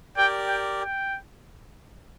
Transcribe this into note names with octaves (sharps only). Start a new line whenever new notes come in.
G4 A#4 D5 G5
G5
G5